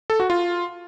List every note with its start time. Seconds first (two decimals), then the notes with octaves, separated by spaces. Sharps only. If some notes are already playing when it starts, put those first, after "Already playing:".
0.10 A4
0.20 F#4
0.30 F4